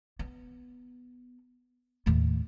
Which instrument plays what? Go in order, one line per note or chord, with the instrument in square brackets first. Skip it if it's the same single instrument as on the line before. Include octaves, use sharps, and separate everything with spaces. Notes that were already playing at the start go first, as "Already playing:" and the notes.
[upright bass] B3
D#2 A2